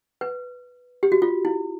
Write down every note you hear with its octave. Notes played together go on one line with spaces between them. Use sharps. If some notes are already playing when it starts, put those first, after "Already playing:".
B4
G4
F#4
F4
E4